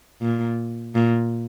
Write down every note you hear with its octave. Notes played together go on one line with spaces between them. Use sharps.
A#2
A#2